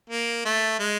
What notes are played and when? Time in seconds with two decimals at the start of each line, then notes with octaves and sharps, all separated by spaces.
0.10 A#3
0.45 A3
0.79 G#3